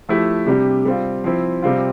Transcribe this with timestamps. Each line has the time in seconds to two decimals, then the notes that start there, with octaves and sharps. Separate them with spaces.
0.09 F3 A3 E4 G4
0.47 C3 G3 D4 G4
0.85 G3 C4 F4
1.24 F3 C4 E4
1.62 C3 G3 C4 F4